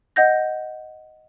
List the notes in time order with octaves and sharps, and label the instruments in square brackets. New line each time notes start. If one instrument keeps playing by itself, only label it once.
[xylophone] D#5 F#5 G6 A#6